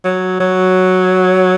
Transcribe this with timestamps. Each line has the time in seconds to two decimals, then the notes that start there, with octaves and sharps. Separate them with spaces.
0.05 F#3
0.40 F#3